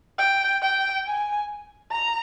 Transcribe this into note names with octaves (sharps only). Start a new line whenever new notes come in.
G5
G5
G#5
A#5